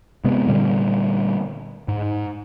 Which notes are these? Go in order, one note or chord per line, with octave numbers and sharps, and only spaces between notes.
C3 G#3 B3
A#2 D3 G3
G#2